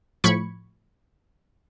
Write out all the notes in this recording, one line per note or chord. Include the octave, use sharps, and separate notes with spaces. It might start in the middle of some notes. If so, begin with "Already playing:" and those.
A2 F3 B5 C#6 G#6 C#7